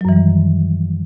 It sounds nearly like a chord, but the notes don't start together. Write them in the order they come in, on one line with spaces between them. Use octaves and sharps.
F#3 F#2 E3 G3 D#3